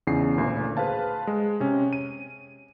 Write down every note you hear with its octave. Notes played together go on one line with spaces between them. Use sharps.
E2 C#3 D#4 C7
A1 D2 A#2
G#4 B4 C5 F5 A5
G#3
C3 C#4
D#7